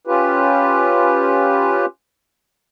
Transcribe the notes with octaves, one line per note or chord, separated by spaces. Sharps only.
C#4 F4 G4 B4